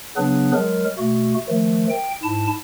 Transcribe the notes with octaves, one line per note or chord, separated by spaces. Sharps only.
C#3 F#3 B3 D4 G#4 B4
F#3 G#3 A#4
B2 A3 F#4
D#3 F3 A3
G5
G#2 E4 A5